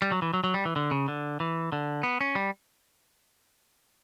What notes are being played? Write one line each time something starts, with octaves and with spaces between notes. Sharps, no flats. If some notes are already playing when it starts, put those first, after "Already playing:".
G3
F#3
E3
F#3
F#3
G3
E3
D3
C#3
D3
E3
D3
B3
C#4
G3